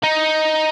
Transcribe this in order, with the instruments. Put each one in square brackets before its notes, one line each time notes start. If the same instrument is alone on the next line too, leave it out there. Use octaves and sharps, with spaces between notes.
[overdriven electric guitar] D#4